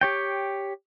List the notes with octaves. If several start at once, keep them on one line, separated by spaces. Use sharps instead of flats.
G4 C#5 G5